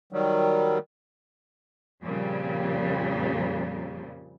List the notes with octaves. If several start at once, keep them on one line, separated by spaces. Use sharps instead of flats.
D#3 F#3 G3
F2 A#2 C#3 F3 G3